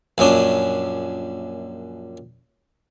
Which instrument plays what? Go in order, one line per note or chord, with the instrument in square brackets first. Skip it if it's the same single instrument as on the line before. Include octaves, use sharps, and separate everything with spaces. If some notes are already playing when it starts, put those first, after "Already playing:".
[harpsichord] A#1 F#2 C#4 D4